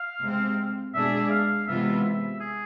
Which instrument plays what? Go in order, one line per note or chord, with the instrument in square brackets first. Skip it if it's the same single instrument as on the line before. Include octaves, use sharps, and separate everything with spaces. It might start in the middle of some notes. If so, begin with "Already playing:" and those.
Already playing: [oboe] F5
[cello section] C3 G#3 C4
[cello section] B2 G#3 D4 G#4 [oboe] E5
[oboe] F5
[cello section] C3 E3 G#3 B3 F4 [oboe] E5
[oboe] E5
G#4